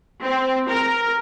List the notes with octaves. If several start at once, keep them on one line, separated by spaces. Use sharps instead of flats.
C4
A#4